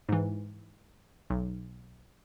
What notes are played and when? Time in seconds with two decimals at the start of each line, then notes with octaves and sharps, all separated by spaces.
0.09 G#2 E3
1.30 B1